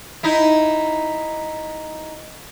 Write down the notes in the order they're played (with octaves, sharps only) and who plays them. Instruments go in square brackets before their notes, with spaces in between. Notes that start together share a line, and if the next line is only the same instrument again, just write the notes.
[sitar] D#4 E4